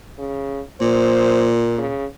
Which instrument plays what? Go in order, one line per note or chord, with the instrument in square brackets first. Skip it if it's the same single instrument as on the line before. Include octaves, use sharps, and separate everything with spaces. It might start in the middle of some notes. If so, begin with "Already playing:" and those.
[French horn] C#3
[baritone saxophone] A#2 [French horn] C5
[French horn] C#3